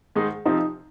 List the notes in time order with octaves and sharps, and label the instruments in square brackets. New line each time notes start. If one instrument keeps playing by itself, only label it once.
[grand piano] G#2 D#3 G#3 D#4 G#4
[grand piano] C3 F3 C4 [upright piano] D#4